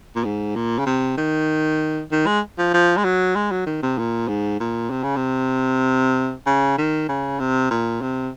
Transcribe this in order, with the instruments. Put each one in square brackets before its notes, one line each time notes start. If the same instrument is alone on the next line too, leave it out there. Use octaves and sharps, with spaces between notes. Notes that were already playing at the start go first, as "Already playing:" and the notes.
[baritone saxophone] A#2
G#2
A#2
C#3
C3
D#3
D#3
G#3
F3
F3
G#3
F#3
G#3
F#3
D#3
C3
A#2
G#2
A#2
C3
C#3
C3
C#3
D#3
C#3
C3
A#2
C3